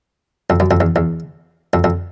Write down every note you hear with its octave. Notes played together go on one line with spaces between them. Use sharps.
F2
F#2
F2
E2
E2
F2
F2